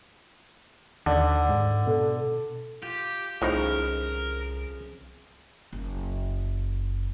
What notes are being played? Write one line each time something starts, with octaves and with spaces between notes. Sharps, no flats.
D#2 D3
G#2
B2 A4
F4 G4
C2 F2 A2 C#3 F3 D#4 A#4
F#1